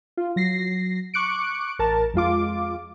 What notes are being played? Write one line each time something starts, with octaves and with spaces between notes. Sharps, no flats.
F4
F#3 A#6 C7
C#6 D6 F#6 C#7 D7
A1 A#4 A5
F2 G#3 F4 D6